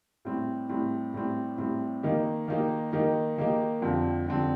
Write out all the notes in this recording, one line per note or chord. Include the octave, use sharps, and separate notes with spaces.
A2 G3 C4
A2 G3 C4
A2 G3 C4
A2 G3 C4
D#3 A#3 D#4 G4
D#3 A#3 D#4 G4
D#3 A#3 D#4 G4
D#3 A#3 D#4 G4
F2 D3 G3 C4
F2 D3 G3 C4